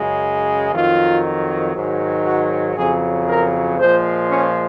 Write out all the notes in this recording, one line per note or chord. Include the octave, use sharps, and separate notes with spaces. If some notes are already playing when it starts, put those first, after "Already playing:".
Already playing: F#2 C#3 G#3
F2 D#3 F#3 F4
G#2 D#3 F#3
F#4
F2 C#3 F#3 G#4
A#4
A#2 F3 G#3 C5
C#4